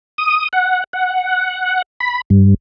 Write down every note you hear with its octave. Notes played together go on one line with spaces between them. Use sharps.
D#6
F#5
F#5
B5
G2